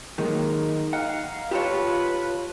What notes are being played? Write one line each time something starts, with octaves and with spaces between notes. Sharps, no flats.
D#3 F#3 G#3 A#3 D#4
D#5 F5 F#5 A#5
F4 G4 A4 B4 C#5